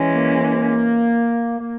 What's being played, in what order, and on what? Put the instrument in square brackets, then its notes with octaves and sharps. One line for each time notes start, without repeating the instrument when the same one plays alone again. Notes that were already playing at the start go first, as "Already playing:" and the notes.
Already playing: [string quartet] E3 G#3 C#4
[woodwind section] A#3
A#3